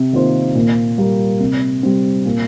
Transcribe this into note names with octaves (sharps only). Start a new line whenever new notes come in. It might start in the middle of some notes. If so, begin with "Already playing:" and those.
Already playing: C3
D#3 A#3 F4 C5
A#2
G3 A#3
C3
G3 C4
A#2